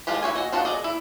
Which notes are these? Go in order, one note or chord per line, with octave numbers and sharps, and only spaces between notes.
F3 G#3 F4 G4
E3 F4 C#5 G#5
F#4 D#5
D4 D#4 F4 F#4 A5
G#4 D5 D#5
E4